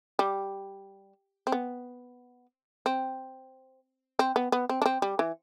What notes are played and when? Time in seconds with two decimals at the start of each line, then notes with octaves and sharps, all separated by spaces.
0.19 G3
1.47 C4
1.52 B3
2.86 C4
4.19 C4
4.36 B3
4.52 B3
4.69 C4
4.82 D4
4.86 C4
5.02 G3
5.19 E3